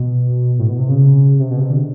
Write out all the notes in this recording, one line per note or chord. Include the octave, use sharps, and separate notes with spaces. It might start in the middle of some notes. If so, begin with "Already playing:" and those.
Already playing: B2
A2
B2
C3
C#3
C3
B2
C3
D3